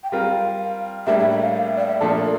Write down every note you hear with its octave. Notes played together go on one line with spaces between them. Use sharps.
G5
G3 C4 F4 A#4 F5
A2 G3 A#3 D4 E5
E5
E5
F5
F5
E5
D5
E5
A#2 F3 A3 D4 A4 D5
A#4